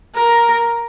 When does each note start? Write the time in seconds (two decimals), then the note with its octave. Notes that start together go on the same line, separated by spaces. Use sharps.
0.16 A#4